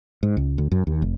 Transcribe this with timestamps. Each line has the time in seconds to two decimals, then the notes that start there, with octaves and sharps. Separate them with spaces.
0.23 G#2
0.37 C#2
0.58 D2
0.72 F#2
0.87 D#2
1.02 F1